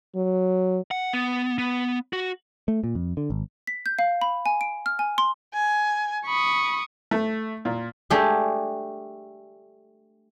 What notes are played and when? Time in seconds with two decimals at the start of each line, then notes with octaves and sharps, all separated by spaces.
0.16 F#3
0.91 F#5
1.13 B3
1.58 B3
2.13 F#4
2.68 A3
2.84 A#2
2.95 F2
3.17 D3
3.30 G#1
3.67 B6
3.86 G6
3.99 F5
4.22 B5
4.46 G#5
4.61 D7
4.86 F6
4.99 G#5
5.18 C6
5.54 G#5
6.26 B5 C#6 D#6
7.11 A3
7.65 A#2
8.10 A3 D4 G4 G#4